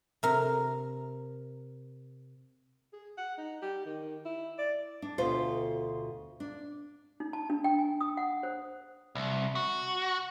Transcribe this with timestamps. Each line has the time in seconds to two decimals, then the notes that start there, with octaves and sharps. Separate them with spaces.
0.23 C3 A#4
2.93 G#4
3.18 F#5
3.38 D#4
3.62 G4
3.86 D#3
4.25 E4
4.58 D5
5.02 D4
5.18 D2 B2 F4 C5
6.40 D4
7.20 D#4
7.33 A5
7.50 D4
7.64 G5
7.79 G#5
8.01 D#6
8.17 F#5
8.43 C5
9.15 C2
9.55 F#4